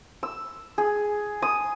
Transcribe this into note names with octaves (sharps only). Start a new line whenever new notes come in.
E6
G#4
D#6